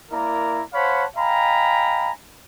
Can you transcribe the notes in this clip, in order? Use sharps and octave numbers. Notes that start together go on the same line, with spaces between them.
A#3 E4 A#4 D5 A#5
C5 C#5 F5 F#5 A5 B5
D#5 F5 G5 G#5 A#5 B5